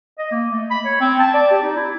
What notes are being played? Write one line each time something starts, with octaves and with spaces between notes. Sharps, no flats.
D#5
A#3
A3
B5
C#5
C4
A5
D5
G4
D#4
E4